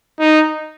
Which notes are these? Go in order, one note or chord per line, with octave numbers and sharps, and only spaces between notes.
D#4